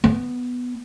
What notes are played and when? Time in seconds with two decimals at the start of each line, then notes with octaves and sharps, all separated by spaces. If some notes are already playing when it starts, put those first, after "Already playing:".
0.04 B3